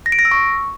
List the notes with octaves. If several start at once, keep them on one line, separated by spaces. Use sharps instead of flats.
A#6
D7
A#6
E6
C#6